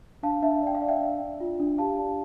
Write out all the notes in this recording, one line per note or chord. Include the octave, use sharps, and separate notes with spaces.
D4 F5 A5
D4 E5
D5 G5
F5
D5
E5 G5
D4
D4
F4
D4
G4 F5 A5
D5